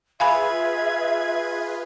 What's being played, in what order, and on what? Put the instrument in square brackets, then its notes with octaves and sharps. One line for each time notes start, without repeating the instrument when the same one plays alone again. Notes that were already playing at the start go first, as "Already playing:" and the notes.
[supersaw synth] F4 G#4 B4 [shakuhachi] E5 [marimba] F5 G#5 B5 [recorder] G#6